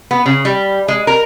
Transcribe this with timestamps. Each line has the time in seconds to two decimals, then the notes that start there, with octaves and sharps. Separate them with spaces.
0.11 B3
0.26 C#3
0.45 G3
0.88 G#3
1.07 A#4